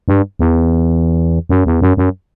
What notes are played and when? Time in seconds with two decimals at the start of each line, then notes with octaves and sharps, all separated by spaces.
0.08 G2
0.39 E2
1.49 F#2
1.66 E2
1.81 F#2
1.97 F#2